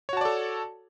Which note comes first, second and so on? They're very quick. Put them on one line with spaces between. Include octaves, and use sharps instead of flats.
C#5 F#4 A5 D5 A4